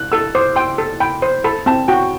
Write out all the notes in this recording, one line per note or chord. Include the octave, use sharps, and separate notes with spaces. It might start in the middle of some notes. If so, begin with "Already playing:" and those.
Already playing: F#6
A4 E6
C5 D6
G5 C6
A4
G5 B5
C5
A4 B5
C4 A5
F#4 G5